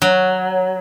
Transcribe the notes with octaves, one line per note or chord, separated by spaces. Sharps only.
F#3